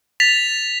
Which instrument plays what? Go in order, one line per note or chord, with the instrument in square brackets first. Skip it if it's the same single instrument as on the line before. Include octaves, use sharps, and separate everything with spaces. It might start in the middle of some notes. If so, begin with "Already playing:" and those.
[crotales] A6 B6 F7